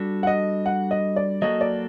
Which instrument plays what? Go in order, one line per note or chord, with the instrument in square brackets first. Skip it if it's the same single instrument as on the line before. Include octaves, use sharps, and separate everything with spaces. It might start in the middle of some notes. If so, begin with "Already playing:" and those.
Already playing: [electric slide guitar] G3 D4 F#4 A4
[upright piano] F#5
D#5
F#5
D#5
D5
[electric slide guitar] F#3 A#3 F#4 A4 [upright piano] D#5
[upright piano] D5